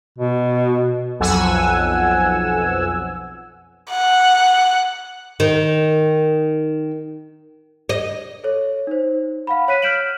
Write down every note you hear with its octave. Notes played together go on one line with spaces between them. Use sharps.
B2
B1 F2 F#5 G#5 E6
F#5
D#3
D#5
A4 C#5
D#4 C5
F5 F#5 B5
C#5 F#6 B6 D#7
F6 G6 B6 D7 E7 F#7